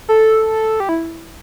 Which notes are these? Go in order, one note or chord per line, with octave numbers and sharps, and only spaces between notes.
A4
G4
E4